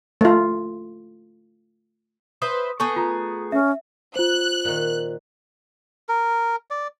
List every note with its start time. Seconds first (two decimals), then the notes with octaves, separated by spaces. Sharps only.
0.21 A3 F4
2.42 B4 C5 E5 D#6
2.80 A3 B3 G#4 C#6
2.96 F4 A#5
3.52 C#4 E5
4.16 F4 C5 F#6
4.65 A#2 D#3
6.09 A#4
6.70 D5